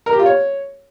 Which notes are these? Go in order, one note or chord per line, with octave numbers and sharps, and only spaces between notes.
A#4
G4
F4
C#5